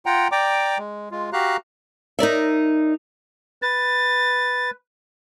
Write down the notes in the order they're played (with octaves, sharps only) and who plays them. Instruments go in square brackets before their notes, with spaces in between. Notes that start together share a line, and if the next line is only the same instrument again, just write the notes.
[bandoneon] F4 F#5 G5 A#5
D5 G5 A#5 D6
G#3
G#3 F4
F#4 G4 F5 A#5 F#6
[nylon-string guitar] D#4 A#4 D5 E5
[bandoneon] B4 [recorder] A6